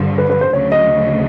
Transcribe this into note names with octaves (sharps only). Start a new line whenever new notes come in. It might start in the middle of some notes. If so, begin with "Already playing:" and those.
Already playing: G2 D3 F3
B4
B4
C5
D2 C#3 F#3 C#5
D#5